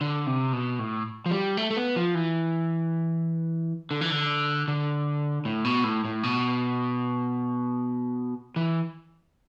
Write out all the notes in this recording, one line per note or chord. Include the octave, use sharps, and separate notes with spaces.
D3
C3
B2
A2
F3
G3
A3
A3
B3
F3
E3
D3
E3
D3
D3
A2
B2
A2
A2
B2
E3